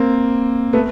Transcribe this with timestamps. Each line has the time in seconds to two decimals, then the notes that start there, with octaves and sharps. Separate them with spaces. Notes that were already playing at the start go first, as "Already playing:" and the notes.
Already playing: A#3 C4
0.73 A3 B3